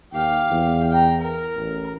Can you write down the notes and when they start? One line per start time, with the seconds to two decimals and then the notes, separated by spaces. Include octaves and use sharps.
0.13 D#2 G4 F5
0.51 E2
0.90 G5 A#5
1.21 A#4
1.56 A1